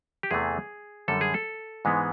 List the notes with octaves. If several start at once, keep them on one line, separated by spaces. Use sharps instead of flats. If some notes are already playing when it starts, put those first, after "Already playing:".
G4
E2 C3 E3 A3 G#4
F#2 D3 G3 A4
G#4
A4
G#2 E3 G#3 B3